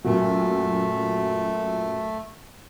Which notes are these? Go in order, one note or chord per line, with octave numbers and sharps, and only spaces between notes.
F#2 A#2 F#3 A3